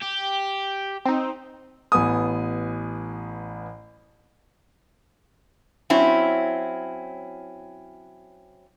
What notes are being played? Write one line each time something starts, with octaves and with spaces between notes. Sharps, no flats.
G4
C4 D#4
A1 B3 G#5 D#6
F#3 C4 C#4 E4